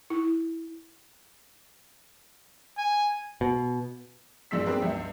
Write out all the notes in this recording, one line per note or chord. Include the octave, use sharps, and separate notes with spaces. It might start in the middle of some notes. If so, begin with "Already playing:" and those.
E4
G#5
B2
A#1 G2 A#2 G#3 E6 B6
C4 D4 G4 G#4 A#4 B4
C#2 G2 E5